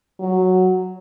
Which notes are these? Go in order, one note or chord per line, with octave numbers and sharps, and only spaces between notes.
F#3